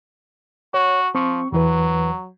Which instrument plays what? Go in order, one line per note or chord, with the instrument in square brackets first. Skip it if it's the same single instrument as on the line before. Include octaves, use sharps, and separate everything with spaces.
[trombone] F#4 [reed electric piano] C#5
[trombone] F3 [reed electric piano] C4 C#6
[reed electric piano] E2 E3 B4 [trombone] F#3